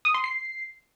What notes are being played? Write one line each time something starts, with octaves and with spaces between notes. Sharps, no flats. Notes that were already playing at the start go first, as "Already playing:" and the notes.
D#6
C6
C7